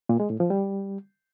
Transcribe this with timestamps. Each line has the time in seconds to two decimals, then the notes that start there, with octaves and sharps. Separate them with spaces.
0.09 A#2
0.20 G#3
0.30 A2
0.40 F3
0.50 G3